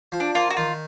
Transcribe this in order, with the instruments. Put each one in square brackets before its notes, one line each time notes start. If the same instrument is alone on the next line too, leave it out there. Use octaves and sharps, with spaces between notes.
[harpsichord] F3
[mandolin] D4
[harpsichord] A#3 [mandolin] F4
[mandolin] F#4
[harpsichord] D#3 [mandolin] F4